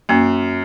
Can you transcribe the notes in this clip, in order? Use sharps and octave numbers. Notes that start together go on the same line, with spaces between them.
F#2 A#3